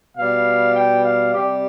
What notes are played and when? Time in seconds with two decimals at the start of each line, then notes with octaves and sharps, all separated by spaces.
0.16 B2 G3 F5
0.74 G5
1.03 F5
1.32 C3 G3 G4